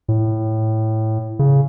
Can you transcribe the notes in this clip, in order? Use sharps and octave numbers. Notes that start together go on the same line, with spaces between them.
A2
C#3